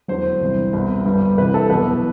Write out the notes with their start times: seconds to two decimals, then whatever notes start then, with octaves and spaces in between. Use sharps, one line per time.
0.08 E1 E2 D3 F#3 C5
0.41 C2 C3 E3 G3
0.73 C2 B2 G3
1.05 G1 G2 D3 G3
1.37 C2 C3 E3 B4
1.54 A4
1.70 E2 B2 F#3 B4